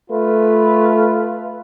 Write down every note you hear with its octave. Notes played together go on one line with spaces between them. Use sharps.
A3 F4 B4